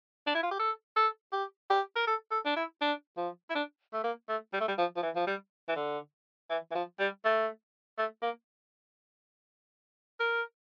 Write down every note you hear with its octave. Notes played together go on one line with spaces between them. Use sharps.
D4
E4
F4
G4
A4
A4
G4
G4
A#4
A4
A4
D4
E4
D4
F3
E4
D4
A3
A#3
A3
G3
A3
G3
F3
F3
E3
F3
G3
E3
D3
E3
E3
F3
G3
A3
A3
A#3
A#4